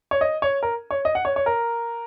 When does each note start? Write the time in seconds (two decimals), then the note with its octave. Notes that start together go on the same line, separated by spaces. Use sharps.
0.11 C#5
0.21 D#5
0.42 C#5
0.63 A#4
0.91 C#5
1.05 D#5
1.15 F#5
1.25 C#5
1.36 C#5
1.46 A#4